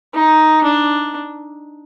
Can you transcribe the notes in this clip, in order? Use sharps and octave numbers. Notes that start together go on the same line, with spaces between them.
D#4
D4